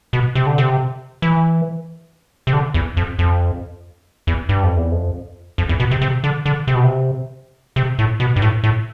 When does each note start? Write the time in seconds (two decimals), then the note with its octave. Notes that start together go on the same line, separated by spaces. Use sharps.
0.13 B2
0.35 C3
0.47 D3
0.58 C3
1.22 E3
2.47 C3
2.53 D3
2.74 E2
2.97 F2
3.19 F2
4.27 E2
4.49 G2
4.63 F2
4.77 E2
4.91 F2
5.58 F2
5.69 E2
5.80 B2
5.91 C3
6.01 C3
6.24 D3
6.46 D3
6.67 C3
6.75 B2
6.84 C3
7.76 C3
7.99 A2
8.20 B2
8.36 G2
8.42 A2
8.64 A2